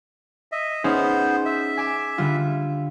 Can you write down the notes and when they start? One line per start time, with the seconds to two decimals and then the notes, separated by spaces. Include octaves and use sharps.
0.52 D#5 E5
0.84 B3 C#4 D#4 G#4 C5
1.45 E5
1.77 G#5 D6 E7
2.18 D3 G3 F4